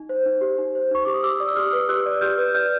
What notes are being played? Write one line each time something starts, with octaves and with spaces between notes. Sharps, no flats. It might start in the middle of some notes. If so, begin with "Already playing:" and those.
Already playing: D#4
C5
D#4
G4
D#4
C5
D#4 C#6
G4 D6
D#6
G4 D6 E6
D5 D#6
E6
G4 D#6 F6
B4
G4 E6 F#6
D5
G4 F6 G6
B4
D5 F6 G6